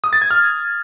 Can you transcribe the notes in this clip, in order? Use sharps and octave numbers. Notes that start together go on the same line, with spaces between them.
D#6
A6
G#6
F6